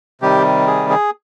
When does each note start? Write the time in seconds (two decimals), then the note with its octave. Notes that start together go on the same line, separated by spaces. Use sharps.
0.21 C3 D#3 G3 G4
0.67 G#4
0.90 G#4